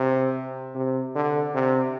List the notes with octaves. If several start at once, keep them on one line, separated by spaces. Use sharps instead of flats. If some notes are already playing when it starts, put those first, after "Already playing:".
Already playing: C3
C3
D3
C3